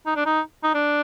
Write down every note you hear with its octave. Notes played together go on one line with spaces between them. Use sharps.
D#4
D4
D#4
D#4
D4